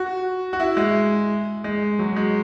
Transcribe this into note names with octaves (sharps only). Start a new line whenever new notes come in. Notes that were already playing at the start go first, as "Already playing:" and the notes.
Already playing: F#4
F#4
E4
G#3
G#3
F#3
G#3